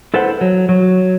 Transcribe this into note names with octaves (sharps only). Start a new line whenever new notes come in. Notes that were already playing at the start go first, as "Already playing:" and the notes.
E4 A4 B4 C5 F#5
F#3
F#3